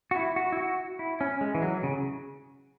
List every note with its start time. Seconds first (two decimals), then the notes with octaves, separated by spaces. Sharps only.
0.11 F#4
0.16 E4
0.36 F#4
0.52 E4
0.57 F#4
0.99 E4
1.21 C#4
1.41 G#3
1.55 E3
1.62 F#3
1.83 C#3